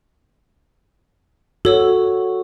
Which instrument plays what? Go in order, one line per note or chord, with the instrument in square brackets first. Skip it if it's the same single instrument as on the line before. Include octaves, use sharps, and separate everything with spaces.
[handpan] F#4 [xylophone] A4 C#5 E6